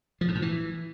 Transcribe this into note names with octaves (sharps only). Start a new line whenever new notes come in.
F3
G#2
A2
E3